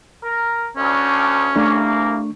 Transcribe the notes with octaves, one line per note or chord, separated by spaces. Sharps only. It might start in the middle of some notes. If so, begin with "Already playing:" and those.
A#4
D2 C#4
C2 A3 A#3 D4 C#6